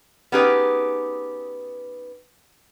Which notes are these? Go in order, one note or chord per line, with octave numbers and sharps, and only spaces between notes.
B3 C#4 D#4 G4 G#4 B4